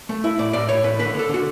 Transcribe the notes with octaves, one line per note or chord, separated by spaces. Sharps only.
A3
E4
A2 D5
A2 D5
A2 C#5
A2 B4
D3 B4
D3 A4
D3 F#4